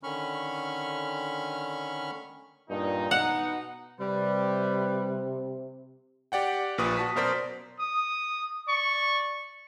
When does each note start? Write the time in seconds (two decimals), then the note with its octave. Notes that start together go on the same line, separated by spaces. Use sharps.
0.03 D3 D#3 C#4 B5 C#6 F6
2.70 G2 A#2 D#4
3.11 B2 D#4 F#5
4.00 C3 G3 B4
6.32 G4 D5 F#5 G5
6.78 A#1 A#2 B4 C#6 D#6
6.97 F#4 A5 B6
7.15 F#2 B2 A#4 C5 D5 B6
7.80 D#6
8.67 D5 C#6